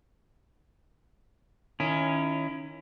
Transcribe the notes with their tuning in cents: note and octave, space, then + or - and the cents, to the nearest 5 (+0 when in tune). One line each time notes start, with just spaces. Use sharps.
D#3 +0 C#4 +0 E4 +25